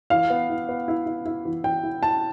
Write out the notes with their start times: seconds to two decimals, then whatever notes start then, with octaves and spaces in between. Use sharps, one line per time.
0.10 E3 F5
0.30 B3
0.50 E4
0.69 B3
0.88 E4
1.06 E4
1.25 E4
1.45 E3
1.64 E3 G5
1.83 E4
2.03 E4 A5